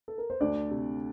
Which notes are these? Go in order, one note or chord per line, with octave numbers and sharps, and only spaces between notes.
A4
A#4
C5
D2 D4 D5
C3